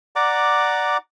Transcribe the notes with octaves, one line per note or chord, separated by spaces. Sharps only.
D5 F#5 A#5 D6